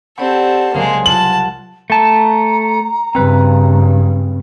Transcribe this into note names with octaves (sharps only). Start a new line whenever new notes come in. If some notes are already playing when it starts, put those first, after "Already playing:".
C4 G4 A4 D5 F#5 G5 B5 C#6
C2 C#3 F#3 G#3 A#3 C6
C4 F4 F#5 A5 F#7
A3 A5 A#5
G2 C#3 C4 B4